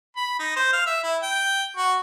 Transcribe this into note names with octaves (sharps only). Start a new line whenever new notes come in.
B5
D#4
C5
F5
E5
E4
G5
F#4